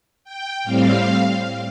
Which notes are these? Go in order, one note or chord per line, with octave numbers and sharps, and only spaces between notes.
G5
A2 G3 C4 F5